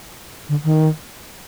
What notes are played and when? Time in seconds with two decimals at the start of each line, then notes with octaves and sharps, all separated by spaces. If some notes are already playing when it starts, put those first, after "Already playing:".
0.49 D3
0.64 D#3